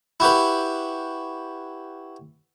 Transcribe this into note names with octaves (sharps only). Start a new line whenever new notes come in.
E4 F#4 G4 B4